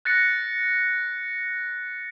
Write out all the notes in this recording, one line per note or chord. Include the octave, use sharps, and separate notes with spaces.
F#6 A6 A#6 C#7